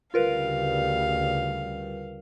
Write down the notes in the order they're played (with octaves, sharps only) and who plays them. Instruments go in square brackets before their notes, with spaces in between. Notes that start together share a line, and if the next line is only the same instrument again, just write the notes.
[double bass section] D2 C#3 G3 [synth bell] F4 A#4 B4 [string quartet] F5